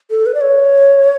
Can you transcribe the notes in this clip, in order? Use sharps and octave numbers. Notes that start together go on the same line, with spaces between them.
A4
B4
D5
C#5